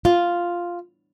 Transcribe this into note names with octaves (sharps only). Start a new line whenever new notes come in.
F4